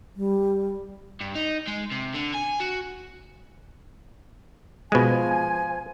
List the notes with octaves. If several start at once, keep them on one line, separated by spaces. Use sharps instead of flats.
G3
G2
D#4
G#3
C3
D3
G#5
F#4
B2 F3 G#3 G#5